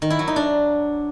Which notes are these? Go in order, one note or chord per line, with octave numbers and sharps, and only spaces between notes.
D#3
E4
F#3
D#4
D4